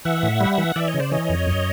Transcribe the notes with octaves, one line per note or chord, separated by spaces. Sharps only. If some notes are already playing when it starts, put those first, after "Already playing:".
E3 E5 F#5
A2
G3
E3
E3 D5 E5
C#5 D#5
C#3
C5 D5
E3 C#5 D#5
F2
F#2